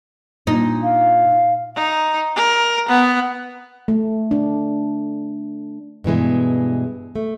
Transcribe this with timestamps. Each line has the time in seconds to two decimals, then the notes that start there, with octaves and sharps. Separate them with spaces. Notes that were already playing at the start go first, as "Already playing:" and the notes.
0.47 A#2 D4 D#4
0.83 F5
1.76 D#4
2.36 A#4
2.89 B3
3.88 A3
4.31 D4
6.04 G2 B2 E3 G#3
7.16 A3